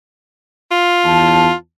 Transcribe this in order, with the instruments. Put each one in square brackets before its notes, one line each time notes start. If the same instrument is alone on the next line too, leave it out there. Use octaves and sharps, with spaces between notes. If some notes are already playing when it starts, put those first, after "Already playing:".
[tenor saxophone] F4
[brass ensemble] E2 A5